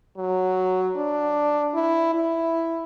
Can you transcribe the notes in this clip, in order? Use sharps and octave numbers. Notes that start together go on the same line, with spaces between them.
F#3
D4
E4
E4